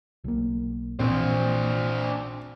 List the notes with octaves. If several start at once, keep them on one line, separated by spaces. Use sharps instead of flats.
B1 A#3
A#1 A#2 E3 C4 D4 C5